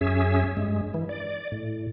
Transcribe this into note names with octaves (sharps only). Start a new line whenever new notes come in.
F#2 C#4 G#4 E5
G2 G#3
E3
D5
A2